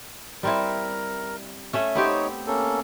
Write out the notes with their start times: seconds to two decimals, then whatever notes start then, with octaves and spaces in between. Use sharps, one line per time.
0.43 G3 C4 E4 A#4
1.73 A3 C#4 E5
1.95 B3 C4 D#4 G4 C#5
2.47 A#3 C#4 A4